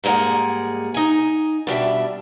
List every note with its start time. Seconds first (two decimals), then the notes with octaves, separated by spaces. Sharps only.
0.04 G#2 G3 G#3 A#3 F#5
0.94 D#4 G#5
1.67 B2 G3 D4 E5